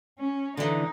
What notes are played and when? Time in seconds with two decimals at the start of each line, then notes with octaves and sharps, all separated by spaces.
0.19 C#4
0.57 D3 E3 D#4